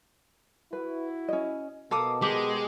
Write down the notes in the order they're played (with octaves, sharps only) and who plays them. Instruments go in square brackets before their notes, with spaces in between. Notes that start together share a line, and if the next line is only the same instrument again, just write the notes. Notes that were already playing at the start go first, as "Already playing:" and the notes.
[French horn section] E4 F#4 [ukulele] B4
[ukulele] C#4 D#5
[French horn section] B2 [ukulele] A4 A#4 [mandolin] F5 D6 D#6
[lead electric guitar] G#3 [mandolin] G4